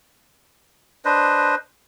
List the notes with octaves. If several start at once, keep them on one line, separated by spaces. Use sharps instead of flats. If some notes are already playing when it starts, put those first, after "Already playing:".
D4 B4 C5 D#5